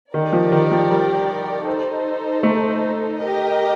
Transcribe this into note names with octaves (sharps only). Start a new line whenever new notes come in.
D#3 G4 A#4 D5
F3
D#3
F3
G3
D#4 A4 C5
A3
G4 A#4 D#5